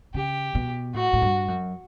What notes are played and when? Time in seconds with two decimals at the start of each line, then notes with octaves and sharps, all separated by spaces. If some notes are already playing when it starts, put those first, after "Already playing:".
0.14 C#3 G4
0.55 B2
0.94 A2 F#4
1.13 A2
1.22 G2
1.48 F#2